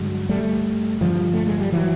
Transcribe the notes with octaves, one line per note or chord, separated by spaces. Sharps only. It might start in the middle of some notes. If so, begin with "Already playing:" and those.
Already playing: G2 D3 F#3 G#3
G3 A3
G2 D3 F3 G3
A3
G#3
G3
E3 F#3